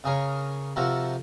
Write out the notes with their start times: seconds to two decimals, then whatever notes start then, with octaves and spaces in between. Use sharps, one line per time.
0.04 C#3 G#4 A#4 C#5
0.76 C3 F3 F#4 A4 A#4